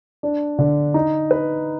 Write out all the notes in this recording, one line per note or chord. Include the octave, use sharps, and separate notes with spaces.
D4
D3
D#4
B4